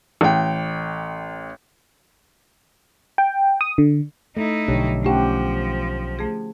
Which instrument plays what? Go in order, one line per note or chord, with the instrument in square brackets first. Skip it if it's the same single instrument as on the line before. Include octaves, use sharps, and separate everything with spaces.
[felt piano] A1 G5
[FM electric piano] G5
D#6
D3
[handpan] A3 [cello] D#4 E4
[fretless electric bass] B1 [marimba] D3 F3 [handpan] D4 G4 C#5
[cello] F3 [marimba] A3 C#4 [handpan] D#4 G4 F#5
[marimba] A3 G#4